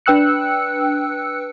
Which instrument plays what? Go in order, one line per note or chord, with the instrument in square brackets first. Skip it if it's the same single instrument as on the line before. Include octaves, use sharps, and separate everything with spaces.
[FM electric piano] D4 B4 G5 E6 F#6 C#7